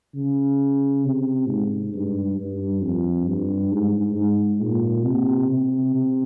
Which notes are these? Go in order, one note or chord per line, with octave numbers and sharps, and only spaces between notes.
C#3
C3
G#2
G2
G2
F2
G2
G#2
G#2
A#2
C3
C3
C3